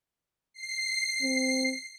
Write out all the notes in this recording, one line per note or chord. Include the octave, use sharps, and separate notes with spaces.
C7
C4